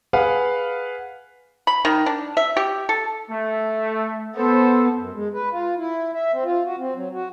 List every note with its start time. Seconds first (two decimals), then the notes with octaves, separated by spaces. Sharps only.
0.13 G#4 B4 F5 F#5
1.67 B5
1.85 D#3
2.06 D4
2.37 E5
2.57 G4
2.89 A4
3.30 A3
4.37 B3 A4 C5
4.97 F#2
5.14 G#3
5.34 B4
5.52 F4
5.78 E4
6.14 E5
6.32 C4
6.45 F4
6.65 F#4
6.79 C4
6.95 F#3
7.14 F#4